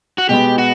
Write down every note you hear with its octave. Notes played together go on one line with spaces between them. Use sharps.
F#4
B2 G#3 B3 G4
F#4